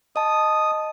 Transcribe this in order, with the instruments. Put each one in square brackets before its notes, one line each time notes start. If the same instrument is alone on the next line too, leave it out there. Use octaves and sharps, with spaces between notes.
[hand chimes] D#5 A5 [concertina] D#6